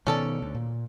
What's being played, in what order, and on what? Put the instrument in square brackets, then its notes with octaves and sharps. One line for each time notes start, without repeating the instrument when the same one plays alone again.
[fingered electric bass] B2 D#3 B3 [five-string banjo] C#4 A4 D5
[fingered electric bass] D2
A#2